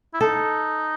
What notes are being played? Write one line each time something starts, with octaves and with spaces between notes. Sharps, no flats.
E4
D#4 A4